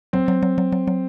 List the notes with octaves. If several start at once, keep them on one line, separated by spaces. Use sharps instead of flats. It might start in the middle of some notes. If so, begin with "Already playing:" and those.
F#3 C4
F#3
F#3
F#3
F#3
F#3